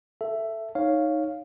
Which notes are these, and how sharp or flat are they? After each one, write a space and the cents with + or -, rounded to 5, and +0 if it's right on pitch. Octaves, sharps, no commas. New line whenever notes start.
A4 +0 E5 +10
D#4 +5 C#5 +0 F5 +0